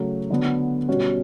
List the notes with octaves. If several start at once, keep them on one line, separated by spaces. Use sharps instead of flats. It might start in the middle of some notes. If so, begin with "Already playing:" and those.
Already playing: C#3 F#3 A3
D3 F#3 B3
B2 G3 C#4 F#4